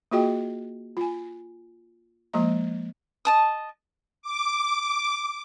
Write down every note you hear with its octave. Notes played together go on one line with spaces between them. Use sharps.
A#3 F4 F#4 G#4 D#5 G5
F4 G#5
F3 G#3 A#3 D#5 A#5
D#5 A5 D#6
D6